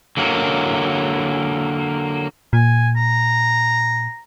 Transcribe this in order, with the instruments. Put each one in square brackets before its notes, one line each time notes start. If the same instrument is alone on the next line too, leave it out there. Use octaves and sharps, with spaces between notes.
[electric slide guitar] D3 F#3 A#3
[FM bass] A#2 [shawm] G#5
[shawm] A#5